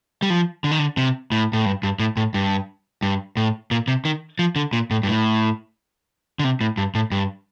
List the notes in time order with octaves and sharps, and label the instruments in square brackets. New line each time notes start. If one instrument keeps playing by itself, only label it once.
[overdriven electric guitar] G3
F3
D3
D#3
D3
C3
A2
A2
G2
G2
A2
A2
G2
G2
A2
A#2
C3
D#3
F3
D3
A#2
A2
G2
A2
D3
C3
A2
G2
A2
G2